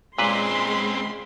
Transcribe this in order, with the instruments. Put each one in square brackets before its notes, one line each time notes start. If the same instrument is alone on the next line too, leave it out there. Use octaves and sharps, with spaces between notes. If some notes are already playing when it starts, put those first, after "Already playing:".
[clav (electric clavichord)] A#2 B4 [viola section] G#3 B5 C6 [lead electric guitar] C4 C#4